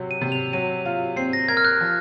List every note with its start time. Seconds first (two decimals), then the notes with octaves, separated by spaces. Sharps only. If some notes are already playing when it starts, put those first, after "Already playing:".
Already playing: C3 F#3
0.11 D#7
0.21 C3
0.32 F7
0.53 F#3 D#7
0.85 F4
1.16 C4 C7
1.33 A#6
1.48 A#4 G#6
1.57 F6
1.65 F#6
1.81 F3